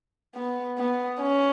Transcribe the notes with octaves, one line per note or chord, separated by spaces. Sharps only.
B3
B3
C#4